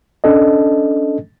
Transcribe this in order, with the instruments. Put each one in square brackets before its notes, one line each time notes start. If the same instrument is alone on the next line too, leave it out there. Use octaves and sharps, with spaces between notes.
[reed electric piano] C#4 D4 A4 D#5